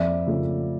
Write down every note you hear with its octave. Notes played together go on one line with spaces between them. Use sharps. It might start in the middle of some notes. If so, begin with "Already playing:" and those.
Already playing: F2 D5 E5
C#3 F3 A3 C#4